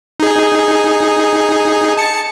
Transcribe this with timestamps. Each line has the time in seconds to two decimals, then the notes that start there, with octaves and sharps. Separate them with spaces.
0.20 D#4 G#4
1.98 A5 C#7